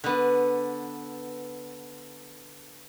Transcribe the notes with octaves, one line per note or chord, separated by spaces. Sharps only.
D3 B3